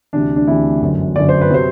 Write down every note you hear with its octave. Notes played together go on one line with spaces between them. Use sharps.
D2 C3 E3 D4
D4
D2 C3 E3 E4
G1 F#2 D3 F#3
G1 F#2 D3 F#3 D5
C5
B4
C3 F#3 C5